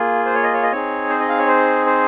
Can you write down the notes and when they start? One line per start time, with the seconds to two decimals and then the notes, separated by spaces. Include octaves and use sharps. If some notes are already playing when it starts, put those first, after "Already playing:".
Already playing: A#3 F4 G#4
0.26 C5
0.34 C#5
0.43 D#5
0.53 C#5
0.63 D#5
0.72 C4 D#4 G#4 C#5
1.09 C5
1.20 D#5
1.29 F5
1.38 C#5
1.47 C5
1.86 C5